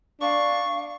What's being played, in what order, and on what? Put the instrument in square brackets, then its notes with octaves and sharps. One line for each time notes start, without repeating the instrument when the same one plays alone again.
[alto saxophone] D4 [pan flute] F5 [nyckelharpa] C#6